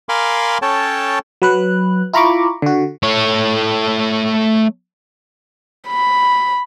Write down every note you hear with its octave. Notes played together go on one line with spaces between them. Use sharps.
A#4 F5 G#5 B5 C6 D6
C#4 A4 C#5 G5 A5
F#3 B4 F#6
E4 F4 A#5 B5 C#6 D6
D3 F#4
A3 C#5
B5